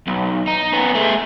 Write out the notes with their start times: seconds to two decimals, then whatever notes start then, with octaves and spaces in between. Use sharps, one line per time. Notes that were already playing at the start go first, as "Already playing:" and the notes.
0.07 B1
0.47 D#4
0.73 B3 C#4
0.95 A3 G#4